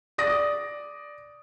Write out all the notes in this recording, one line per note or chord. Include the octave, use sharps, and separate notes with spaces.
D5 D#6 A#6